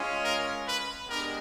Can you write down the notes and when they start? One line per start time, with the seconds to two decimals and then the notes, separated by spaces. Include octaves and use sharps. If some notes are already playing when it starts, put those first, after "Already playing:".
Already playing: G#3 C#4 F4
0.21 A#4
0.64 B4
1.08 G#3 B3 D4 G4 A#4